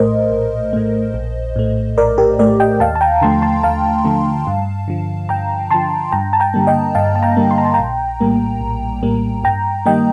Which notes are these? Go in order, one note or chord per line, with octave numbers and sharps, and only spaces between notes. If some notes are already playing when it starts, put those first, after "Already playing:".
Already playing: A#1 A2 A3 A#4 C5 D#5
A#1
A2 A3
A#1
A2 A3
A#1 A#4 D5
G4 A#4
A2 A3 A#4 D5
D#5 G5
D#2 F5 A5
A5
G5 A#5
D3 F3 A3 A5 C6
A5 C6
D#2 F5 A5
D3 F3 A3
G2
D3 F3
G2 G5 A#5
D3 F3 A5 C6
G2 G5 A#5
A5
G5 A#5
D3 G3 A#3
D#5 G5
G2 F5 A5
A5
G5 A#5
D3 G3 A#3
C6
A#5
A5
G5 A#5
A#1
A2 G3 A#3
A#1
A2 G3 A#3
G2 G5 A#5
D#3 G3 A#3 D#5 G5